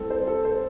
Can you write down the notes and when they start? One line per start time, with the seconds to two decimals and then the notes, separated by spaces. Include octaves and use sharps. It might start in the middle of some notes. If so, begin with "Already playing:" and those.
Already playing: A2 G3 C4 A4
0.10 C5
0.27 A4
0.45 C5